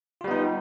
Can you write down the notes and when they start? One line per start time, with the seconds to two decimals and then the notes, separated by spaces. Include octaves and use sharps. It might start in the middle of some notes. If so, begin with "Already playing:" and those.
0.21 F4
0.24 G3
0.28 B3
0.31 D#4